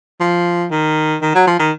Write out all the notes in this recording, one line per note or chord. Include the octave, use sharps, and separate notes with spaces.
F3
D#3
D#3
F#3
F3
D#3